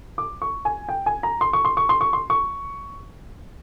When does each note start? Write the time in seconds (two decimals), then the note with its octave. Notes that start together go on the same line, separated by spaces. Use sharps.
0.18 D6
0.42 C#6
0.65 G#5
0.89 G5
1.06 G#5
1.23 A#5
1.41 C6
1.53 C#6
1.65 C6
1.77 C#6
1.89 C6
2.01 C#6
2.13 C6
2.30 C#6